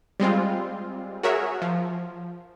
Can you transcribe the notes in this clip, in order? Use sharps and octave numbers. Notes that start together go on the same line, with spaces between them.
G3 G#3 C4 F4
F#4 G#4 A#4 C#5 E5
F3